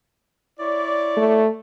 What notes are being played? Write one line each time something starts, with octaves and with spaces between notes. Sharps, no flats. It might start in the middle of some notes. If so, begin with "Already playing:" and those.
E4 C#5 D5
A3